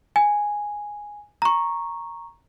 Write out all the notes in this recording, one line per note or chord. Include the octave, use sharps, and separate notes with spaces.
G#5
A#5 C#6